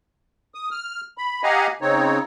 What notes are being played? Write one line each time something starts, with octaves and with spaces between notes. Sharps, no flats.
D#6
F6
B5
G4 D#5 F5 F#5 G#5 A#5
C#3 C4 D#4 C#5